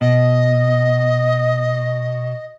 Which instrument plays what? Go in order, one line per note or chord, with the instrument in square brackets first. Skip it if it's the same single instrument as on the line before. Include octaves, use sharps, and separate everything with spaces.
[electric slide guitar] B2 [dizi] D#5